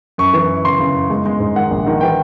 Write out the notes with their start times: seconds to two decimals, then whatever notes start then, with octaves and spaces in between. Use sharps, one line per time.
0.18 F#2 C#6
0.34 E3
0.50 F#2
0.64 C#3 C6
0.80 C#3
0.94 F#2
1.10 G#3
1.26 G#3
1.40 G#2
1.55 D#3 F#5
1.71 A#1
1.87 D#3
2.01 E3 G5